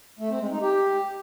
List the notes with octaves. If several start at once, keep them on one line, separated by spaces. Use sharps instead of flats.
A3
C4
G#3
D#4
G4